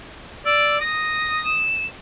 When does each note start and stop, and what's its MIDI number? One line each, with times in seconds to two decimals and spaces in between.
0.46 0.79 74
0.46 0.80 88
0.81 1.59 87
0.81 1.43 94
1.45 1.86 100